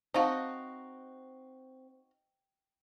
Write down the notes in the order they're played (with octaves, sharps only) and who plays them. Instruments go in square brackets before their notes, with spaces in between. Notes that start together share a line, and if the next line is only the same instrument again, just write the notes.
[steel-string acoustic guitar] C4 [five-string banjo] D#4 F#4 [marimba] C5 F5 A5